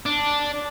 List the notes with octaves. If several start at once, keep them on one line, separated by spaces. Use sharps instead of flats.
D4